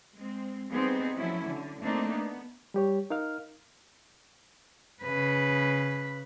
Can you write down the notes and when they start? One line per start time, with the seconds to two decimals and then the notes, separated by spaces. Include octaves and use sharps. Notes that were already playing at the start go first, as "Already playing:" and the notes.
0.14 G#3 C4
0.70 G3 B3 C4 D#4 G#4
1.16 F3 F#3 A3 C#4 E4
1.48 D3
1.81 A3 A#3 C4 D4 D#4
2.11 B3
2.74 G3 G4 C#5
3.10 D#4 A#4 F5 F6
5.03 C#3 B4